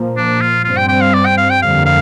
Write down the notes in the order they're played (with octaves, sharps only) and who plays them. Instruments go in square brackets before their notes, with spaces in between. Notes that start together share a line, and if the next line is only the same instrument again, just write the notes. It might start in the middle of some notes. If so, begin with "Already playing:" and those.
Already playing: [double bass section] A#2 F3 A#3
[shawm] D4
F4
[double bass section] G2 G3 C4 [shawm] F4
[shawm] G5
G5
F5
D5
G5
F5
G5
[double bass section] F2 D3 G3 A#3 [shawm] F5
[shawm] F5